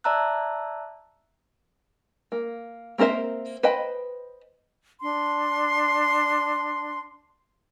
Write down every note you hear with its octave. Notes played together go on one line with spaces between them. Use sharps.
D5 E5 A5 A#5 E6 F#6
A#3
A#3 C4 A#4 C5 E5
B4 C5 D#5 G5 B5
D4 C6